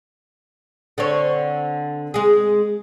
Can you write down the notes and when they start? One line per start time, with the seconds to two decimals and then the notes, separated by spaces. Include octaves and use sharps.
0.98 D3 C4 C#5
2.14 G#3 G#4